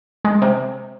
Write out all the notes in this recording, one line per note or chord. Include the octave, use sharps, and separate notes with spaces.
G#3
C3